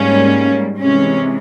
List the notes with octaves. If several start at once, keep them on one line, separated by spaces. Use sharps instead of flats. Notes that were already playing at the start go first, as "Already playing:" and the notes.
Already playing: G#2 G3 A#3 C#4
C3 E3 G#3 C#4